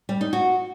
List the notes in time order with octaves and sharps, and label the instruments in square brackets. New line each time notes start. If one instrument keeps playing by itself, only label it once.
[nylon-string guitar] G3
D#4
F#4